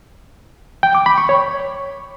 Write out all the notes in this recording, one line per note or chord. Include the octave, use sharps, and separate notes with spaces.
G5
D6
B5
C#6
C#5